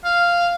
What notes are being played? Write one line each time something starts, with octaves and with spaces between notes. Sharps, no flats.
F5